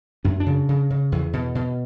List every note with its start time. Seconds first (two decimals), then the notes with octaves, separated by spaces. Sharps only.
0.24 F#2 D4
0.40 D4
0.46 C#3
0.69 C#3
0.90 C#3
1.12 E2
1.33 B2
1.55 B2